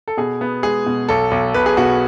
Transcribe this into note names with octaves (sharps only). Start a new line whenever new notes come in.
A4
B2 G#4
B3
G#3 G#4
B2
B1 A4
B1
B1 B4
G#4
B2 F#4